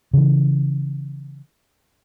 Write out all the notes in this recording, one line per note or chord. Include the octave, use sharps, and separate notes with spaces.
C#3 E3